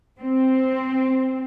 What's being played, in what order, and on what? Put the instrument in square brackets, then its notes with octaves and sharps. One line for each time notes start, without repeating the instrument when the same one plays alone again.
[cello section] C4